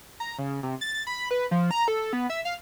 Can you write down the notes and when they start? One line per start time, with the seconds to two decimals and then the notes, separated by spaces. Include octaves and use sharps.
0.20 A#5
0.38 C#3
0.63 C3
0.81 A6
1.07 B5
1.31 B4
1.51 F3
1.71 A#5
1.88 A4
2.13 B3
2.30 E5
2.45 F5